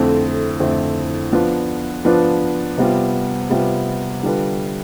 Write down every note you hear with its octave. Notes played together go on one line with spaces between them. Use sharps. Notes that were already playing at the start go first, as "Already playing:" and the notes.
Already playing: F2 D3 A3 C4 E4
F2 D3 A3 C4 E4
F3 B3 D4 F4 B4
F3 B3 D4 F4 B4
C3 G3 B3 F4
C3 G3 B3 F4
D3 G3 D4 F4 B4